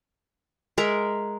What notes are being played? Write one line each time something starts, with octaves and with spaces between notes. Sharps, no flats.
G#3 A#4 E5